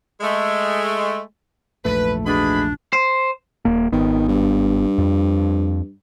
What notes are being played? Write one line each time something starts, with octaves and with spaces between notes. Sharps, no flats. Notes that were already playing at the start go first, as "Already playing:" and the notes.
G#3 A3
A#1 E2 G#2 A3 B4
B2 D4 G#4 B5
C5
D#1 A#3
G#1 D#3 B3
G2
F2